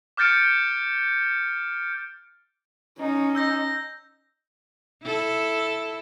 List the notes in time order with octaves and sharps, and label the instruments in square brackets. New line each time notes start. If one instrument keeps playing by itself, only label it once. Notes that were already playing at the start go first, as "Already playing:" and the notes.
[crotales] D6 F6 G6 A6 C#7 D7
[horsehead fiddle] C#4 [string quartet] D#4
[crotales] E6 G6 A#6
[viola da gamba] E4 A4